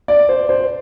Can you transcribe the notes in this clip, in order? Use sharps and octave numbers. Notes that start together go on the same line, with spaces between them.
D5
C5
C5